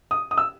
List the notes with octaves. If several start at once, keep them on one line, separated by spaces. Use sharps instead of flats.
D#6
D#6
E6